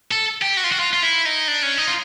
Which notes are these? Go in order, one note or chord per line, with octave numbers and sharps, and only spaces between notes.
A4
G4
F#4
F4
F#4
F4
F4
E4
D#4
D4
C#4
D#4
F4